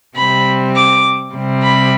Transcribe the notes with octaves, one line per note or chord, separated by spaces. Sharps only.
C3 G3 C4 B5
D6
C3 G3 C4
B5